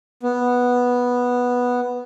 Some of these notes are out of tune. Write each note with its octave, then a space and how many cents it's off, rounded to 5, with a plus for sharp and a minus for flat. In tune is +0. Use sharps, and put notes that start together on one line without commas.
B3 -5